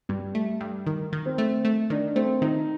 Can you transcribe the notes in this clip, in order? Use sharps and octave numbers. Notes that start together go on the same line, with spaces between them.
G2 G3
A3
G2
D#3
D#3
C4
A3
A3
D#3 D4
A3 C4
D#3 D#4